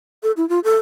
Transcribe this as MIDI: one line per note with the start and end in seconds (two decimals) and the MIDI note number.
0.23 0.32 69
0.37 0.47 64
0.49 0.60 65
0.64 0.77 69